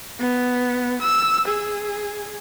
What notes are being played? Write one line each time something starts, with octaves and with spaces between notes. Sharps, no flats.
B3
E6
G#4